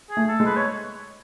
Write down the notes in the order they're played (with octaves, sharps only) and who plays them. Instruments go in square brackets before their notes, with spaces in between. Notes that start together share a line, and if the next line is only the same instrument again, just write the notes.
[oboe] G#4
[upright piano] A3
[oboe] A4
[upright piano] G#3
[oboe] B4
C#5